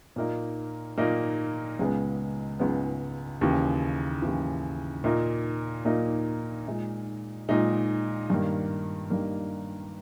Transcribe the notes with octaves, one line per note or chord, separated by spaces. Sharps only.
A#2 A#3 D#4
A#2 A#3 D#4
C#2 C#3 G#3 B3
C#2 C#3 G#3 B3
D#2 C#3 E3
D#2 C#3 E3
A#2 A#3 D#4
A#2 A#3 D#4
A#2 G#3 D#4
A#2 G#3 D#4
G2 D#3 A#3
G2 D#3 A#3